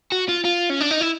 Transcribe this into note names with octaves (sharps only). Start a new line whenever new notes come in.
F#4
F4
F4
C#4
D4
D#4
E4